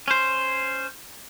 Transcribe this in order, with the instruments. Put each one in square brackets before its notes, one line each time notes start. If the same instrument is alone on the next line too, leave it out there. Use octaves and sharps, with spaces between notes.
[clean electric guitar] C#4 C5